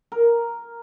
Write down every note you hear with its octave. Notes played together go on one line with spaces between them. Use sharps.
A#4